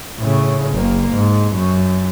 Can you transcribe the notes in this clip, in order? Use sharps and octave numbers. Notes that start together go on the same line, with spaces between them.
A2 C#3
F#1 A#3
G#2
F#2